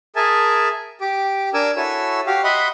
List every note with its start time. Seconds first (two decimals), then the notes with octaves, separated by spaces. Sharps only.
0.16 G#4 A#4 E5 G#5 A5
1.01 G4 D6
1.54 D4 A#4 G#5 D6 E6
1.76 E4 F#4 A4 C#5 G#5 E6
2.27 F#4 G4 F5
2.44 D#5 E5 F#5 B5 C6